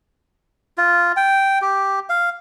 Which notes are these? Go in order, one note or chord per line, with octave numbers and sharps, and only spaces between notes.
F4
G5
G4
F5